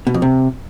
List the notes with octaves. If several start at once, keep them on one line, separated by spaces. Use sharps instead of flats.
B2
F2
C3